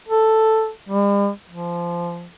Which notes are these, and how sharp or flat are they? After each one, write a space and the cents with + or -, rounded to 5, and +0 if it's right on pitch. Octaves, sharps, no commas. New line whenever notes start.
A4 +5
G3 +45
F3 -20